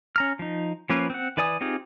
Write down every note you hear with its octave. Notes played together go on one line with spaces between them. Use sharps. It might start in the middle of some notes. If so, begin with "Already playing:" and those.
C#4 A#5 F6
F3 D#4
F3 A#3 C#4 B4
C4 F#5
E3 B4 D5 G#5 D#6
C4 D#4 F4 G4 G#4